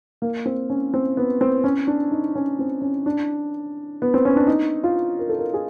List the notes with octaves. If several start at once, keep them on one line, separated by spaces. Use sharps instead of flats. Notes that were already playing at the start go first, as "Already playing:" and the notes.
A#3
C4
C#4
C4
B3
C4
C#4
D4
D#4
C#4
C4
C#4
D4
B3
C4
C#4
D4
D#4
F4
A#4
A4
A#4
G#4